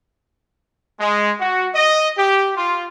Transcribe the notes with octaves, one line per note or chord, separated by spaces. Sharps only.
G#3
F#4
D#5
G4
F4